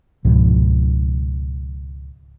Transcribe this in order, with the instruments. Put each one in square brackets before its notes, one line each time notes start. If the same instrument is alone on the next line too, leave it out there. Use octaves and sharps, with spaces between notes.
[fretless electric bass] C#2 G#2 B2 F3